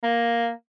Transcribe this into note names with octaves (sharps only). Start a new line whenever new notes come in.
A#3